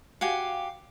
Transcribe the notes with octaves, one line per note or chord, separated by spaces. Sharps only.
F#4 G4 F5 G#5